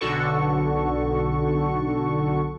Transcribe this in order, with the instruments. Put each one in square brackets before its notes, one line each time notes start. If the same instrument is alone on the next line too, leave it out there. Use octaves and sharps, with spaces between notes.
[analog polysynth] B1 D3 F#4 A4 C#6